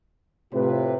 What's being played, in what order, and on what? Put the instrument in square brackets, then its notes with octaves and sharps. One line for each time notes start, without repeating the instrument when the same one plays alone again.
[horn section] A2 C3 [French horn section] F4 B4